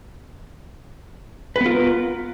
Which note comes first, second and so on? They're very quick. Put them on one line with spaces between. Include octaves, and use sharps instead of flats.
B4 B3 F4 A#4